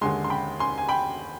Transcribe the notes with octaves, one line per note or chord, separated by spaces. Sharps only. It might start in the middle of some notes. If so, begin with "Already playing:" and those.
D#2 D3 G#3 G#5 C6
C6
G5 B5
G#5 C6
G#5
G5 B5